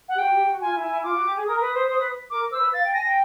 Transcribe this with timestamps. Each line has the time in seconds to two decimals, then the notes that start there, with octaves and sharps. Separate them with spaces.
0.09 F#5
0.14 G4
0.18 F#4 G5
0.33 G4
0.47 F#4
0.61 F4 G#5
0.75 E4
0.83 G#5
0.89 E4
1.04 F4 D6
1.14 F#4
1.24 G4
1.36 G#4
1.46 A#4 D#6
1.60 B4
1.74 C5
1.88 C5
1.98 B4
2.30 A#4 D6
2.51 C5 E6
2.58 B4
2.73 F5 A6
2.84 G5
2.94 G#5 A#6
3.05 G5